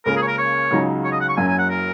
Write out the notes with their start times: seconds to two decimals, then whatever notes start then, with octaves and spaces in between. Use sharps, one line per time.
0.06 C#2 C#3 A#3 C#4 A#4
0.16 G#4
0.22 C#5
0.28 A#4
0.38 C#5
0.71 C#2 C#3 F#3 D#4
1.04 C#5
1.12 D#5
1.21 F#5
1.29 C#6
1.37 F#1 F#2 F#3 C#4 G#5
1.47 G#5
1.59 F#5
1.70 A#4